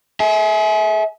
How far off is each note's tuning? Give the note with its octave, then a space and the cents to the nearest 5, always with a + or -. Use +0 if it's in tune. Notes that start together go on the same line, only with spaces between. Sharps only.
G#4 +30 E5 -25